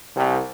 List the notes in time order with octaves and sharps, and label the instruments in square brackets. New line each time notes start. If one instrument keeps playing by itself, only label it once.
[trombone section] C2